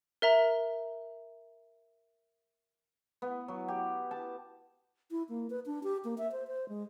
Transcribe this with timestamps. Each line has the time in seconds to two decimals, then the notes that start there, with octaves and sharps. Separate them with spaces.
0.22 A#4 E5 A#5
3.22 B3
3.48 F#3
3.68 G4
4.11 A5
5.11 E4
5.29 A#3
5.50 B4
5.66 D4
5.83 G4
6.05 A#3
6.18 E5
6.32 C5
6.47 C5
6.69 G#3